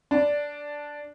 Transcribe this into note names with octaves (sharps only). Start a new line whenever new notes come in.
D4